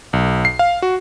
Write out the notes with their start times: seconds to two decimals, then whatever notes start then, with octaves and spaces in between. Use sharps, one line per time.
0.13 B1
0.45 C7
0.59 F5
0.82 F#4